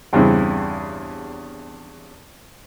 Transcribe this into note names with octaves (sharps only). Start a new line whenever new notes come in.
E2 G2 C#3 C4 E4